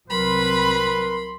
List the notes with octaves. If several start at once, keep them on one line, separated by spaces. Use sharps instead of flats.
C2 F#3 C4 A#4 B4 B5 C6